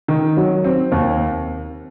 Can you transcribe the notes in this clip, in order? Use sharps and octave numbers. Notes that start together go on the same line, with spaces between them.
D#3
F#3
C4
D#2